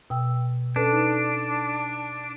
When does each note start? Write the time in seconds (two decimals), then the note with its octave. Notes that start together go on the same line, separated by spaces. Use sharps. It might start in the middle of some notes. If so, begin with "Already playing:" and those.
0.10 B2 G5 E6
0.76 C#4 D4 A4 B4
0.92 D#4